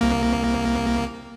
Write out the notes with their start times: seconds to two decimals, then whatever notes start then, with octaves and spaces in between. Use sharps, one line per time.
0.01 C2 A#3